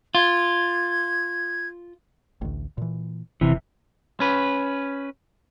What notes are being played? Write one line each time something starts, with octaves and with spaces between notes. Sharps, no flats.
F4 G#6
A1 D2
A#2 E3
F1 C3 E3
C#4 B4